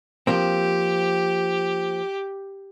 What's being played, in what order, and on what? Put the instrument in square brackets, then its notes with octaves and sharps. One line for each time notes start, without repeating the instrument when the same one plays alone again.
[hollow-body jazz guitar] F3 A#3 C4 [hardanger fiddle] G4